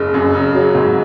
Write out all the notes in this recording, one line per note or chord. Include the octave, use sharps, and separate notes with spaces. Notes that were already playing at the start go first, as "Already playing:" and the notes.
Already playing: F#1 C#3
F#2
C#3
F#3
G#2